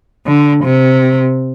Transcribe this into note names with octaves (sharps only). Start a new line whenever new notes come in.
D3
C3